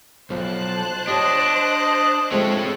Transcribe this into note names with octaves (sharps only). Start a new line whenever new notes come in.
B1 F3 C5 A5 F#6
D4 G4 C#5 D#5
F3 G#3 A3 C4 C#5